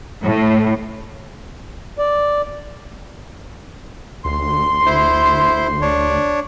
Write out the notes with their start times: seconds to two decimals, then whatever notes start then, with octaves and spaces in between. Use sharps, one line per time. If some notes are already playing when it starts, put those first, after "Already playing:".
0.24 A2
1.98 D5
4.25 D2 C6
4.86 E4 C5
5.81 D4 C#5